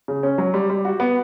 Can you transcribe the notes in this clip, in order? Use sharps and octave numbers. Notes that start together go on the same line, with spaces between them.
C#3
C#4
F#3
G3
G3
F#4
B3